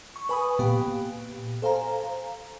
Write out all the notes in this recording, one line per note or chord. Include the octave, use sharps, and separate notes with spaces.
C#6
B4 G#5 B5 C#6 D#6
A#2 B3 G4
A4 C5 F5 G#5 A#5